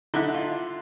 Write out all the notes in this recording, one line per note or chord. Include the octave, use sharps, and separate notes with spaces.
D3 D#4 E4 F#5
F4